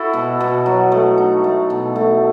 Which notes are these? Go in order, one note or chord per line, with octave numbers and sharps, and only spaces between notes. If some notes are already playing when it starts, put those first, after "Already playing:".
Already playing: E4 F#4 A4
B2
B2
F#3
A3
D#4
A3
B2
A3